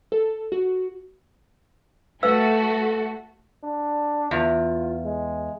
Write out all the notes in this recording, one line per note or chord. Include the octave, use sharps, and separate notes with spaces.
A4
F#4
A3 F#4 A4 B4 F5 E6
D4
E2 F4
G#3